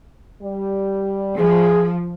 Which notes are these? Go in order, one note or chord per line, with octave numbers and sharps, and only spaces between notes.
G3
F3 G#4